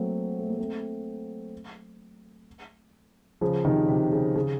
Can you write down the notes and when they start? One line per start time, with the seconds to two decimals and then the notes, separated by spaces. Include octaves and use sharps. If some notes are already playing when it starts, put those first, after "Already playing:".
Already playing: F#3 A3 A#3 C4
0.39 A3
0.48 A#3
0.58 A3 C4
3.41 C#3 F3
3.65 C3 D#3
3.88 C3
4.12 C#3
4.36 C#3